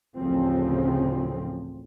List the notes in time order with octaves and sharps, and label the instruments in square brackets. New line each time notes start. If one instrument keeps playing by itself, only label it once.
[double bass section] A1 D2 C#3 F3 C4